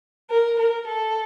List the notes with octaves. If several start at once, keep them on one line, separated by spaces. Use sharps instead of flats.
A#4
A#4
A4